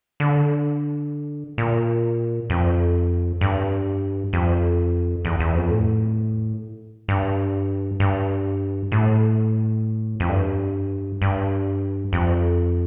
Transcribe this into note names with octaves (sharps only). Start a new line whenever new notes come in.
D3
A#2
F2
G2
F2
E2
E2
F2
A2
G2
G2
A2
F2
G2
G2
F2